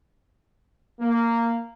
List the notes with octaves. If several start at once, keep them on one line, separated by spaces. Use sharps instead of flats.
A#3